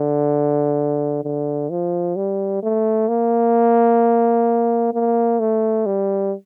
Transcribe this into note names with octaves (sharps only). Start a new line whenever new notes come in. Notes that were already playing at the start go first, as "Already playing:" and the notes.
Already playing: D3
D3
F3
G3
A3
A#3
A#3
A3
G3